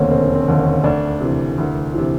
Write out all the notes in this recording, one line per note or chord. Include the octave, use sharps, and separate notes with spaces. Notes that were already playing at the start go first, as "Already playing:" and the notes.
Already playing: E1 D#2 D3 A3 A#3 C4 C#4
E1 C4
C4
D#2 D3
C#4
D2 D4
C3 E3
D2
C3 E3